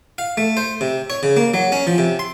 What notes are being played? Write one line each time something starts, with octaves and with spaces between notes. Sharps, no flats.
F5
A3
C5
C3
C#5
C#3
A#3
F#3
C#4
F3
C3
C6